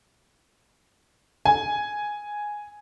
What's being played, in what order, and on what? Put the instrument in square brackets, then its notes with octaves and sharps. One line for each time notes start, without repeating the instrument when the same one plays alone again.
[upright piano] G#5